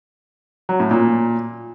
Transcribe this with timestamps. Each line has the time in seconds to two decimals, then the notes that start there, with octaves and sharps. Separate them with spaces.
0.69 F#3
0.80 A2
0.91 A#2